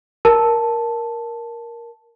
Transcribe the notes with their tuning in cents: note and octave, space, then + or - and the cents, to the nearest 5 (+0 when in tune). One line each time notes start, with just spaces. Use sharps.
A#4 +5 A5 +0